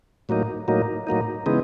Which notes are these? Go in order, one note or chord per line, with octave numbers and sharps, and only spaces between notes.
A2 F#3 A#3 D#4
A2 F#3 A#3 D#4
A2 F#3 A#3 D#4
C#3 E3 G#3 B3 D#4